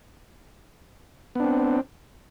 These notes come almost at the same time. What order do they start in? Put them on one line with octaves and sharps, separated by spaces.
B3 D4 C4